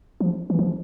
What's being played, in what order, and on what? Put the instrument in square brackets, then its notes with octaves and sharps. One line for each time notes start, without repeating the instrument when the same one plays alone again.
[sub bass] F3
E3
F3